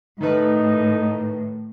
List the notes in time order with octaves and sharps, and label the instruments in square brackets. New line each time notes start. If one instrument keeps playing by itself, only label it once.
[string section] A2 [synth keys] D#3 A3 B4 [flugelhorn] D#4